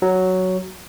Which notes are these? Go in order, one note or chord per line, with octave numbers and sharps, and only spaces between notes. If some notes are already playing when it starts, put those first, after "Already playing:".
F#3